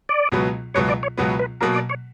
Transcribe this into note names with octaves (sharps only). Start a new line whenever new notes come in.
D5
C#2 B2 F#3 B3
C#2 B2 F#3 B3 C#5
D5
C#5
C#2 B2 F#3 B3
B4
B2 F#3 A#3 A#4
D5
C#5